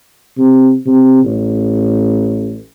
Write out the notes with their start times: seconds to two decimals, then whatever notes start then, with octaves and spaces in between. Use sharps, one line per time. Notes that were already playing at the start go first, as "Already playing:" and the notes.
0.37 C3
0.86 C3
1.24 A1